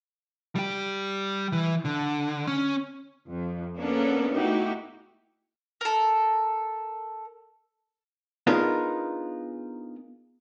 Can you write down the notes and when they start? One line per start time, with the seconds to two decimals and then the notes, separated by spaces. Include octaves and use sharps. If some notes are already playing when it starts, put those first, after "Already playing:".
0.55 G3 G4
1.52 E3
1.85 D3
2.47 C#4 C#5
3.29 F2
3.78 A#3 B3 C#4 D4 A4 A#4
4.34 A3 D#4 E4 F#4 G4
5.81 A4 A#4
8.47 B3 D4 D#4 F4 G#4 A#4